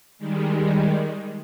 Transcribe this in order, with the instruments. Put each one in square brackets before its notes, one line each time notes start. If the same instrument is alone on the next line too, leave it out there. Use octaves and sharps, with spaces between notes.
[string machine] D#3 G3 G#3